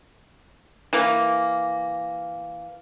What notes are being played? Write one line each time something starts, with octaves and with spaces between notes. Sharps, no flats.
E3 A#3